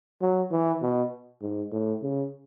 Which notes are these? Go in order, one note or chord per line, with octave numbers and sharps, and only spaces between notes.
F#3
E3
B2
G#2
A2
C#3